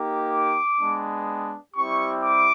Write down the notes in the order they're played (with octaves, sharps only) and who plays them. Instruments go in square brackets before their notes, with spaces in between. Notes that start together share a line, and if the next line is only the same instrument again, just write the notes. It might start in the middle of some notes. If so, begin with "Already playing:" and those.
Already playing: [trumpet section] A#3 D#4 G4
D6
G#3 B3 D4
G3 C4 E4 G4 C#6
D6